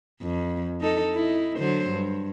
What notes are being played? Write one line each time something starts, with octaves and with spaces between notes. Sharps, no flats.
F2
D#4 A4
D#4 E4
D3 F#3 C5
G2